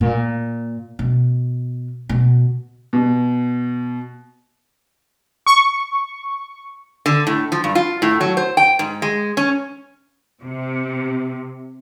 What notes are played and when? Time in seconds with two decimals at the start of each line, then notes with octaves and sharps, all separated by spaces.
0.01 A#2
0.99 B2
2.09 B2
2.93 B2
5.46 C#6
7.06 D3
7.27 A2
7.52 F3
7.64 G2
7.75 F4
8.02 A2
8.21 F#3
8.37 C5
8.57 G5
8.79 G#2
9.02 G#3
9.37 C#4
10.41 C3